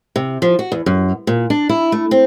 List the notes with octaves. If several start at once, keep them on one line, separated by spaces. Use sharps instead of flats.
C3
F3
F#4
E2
F#2
A#2
D4
E4
A3
C4